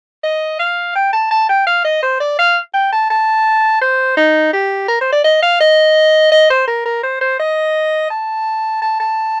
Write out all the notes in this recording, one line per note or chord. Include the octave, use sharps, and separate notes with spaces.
D#5
F5
G5
A5
A5
G5
F5
D#5
C5
D5
F5
G5
A5
A5
C5
D#4
G4
A#4
C5
D5
D#5
F5
D#5
D#5
C5
A#4
A#4
C5
C5
D#5
A5
A5
A5